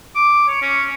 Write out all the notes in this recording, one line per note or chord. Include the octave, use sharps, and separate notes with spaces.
D6
C#5
C#4